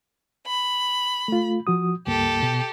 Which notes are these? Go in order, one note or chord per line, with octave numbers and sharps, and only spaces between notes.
B5
A3 F4
F3 F#4 D#6
C#2 G2 A#3 G4 A4
B2